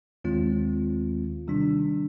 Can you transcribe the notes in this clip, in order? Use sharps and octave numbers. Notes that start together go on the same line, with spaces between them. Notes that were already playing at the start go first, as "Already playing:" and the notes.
D#2 D#3 G#3 C4 F4
C3 D#3 G3 D4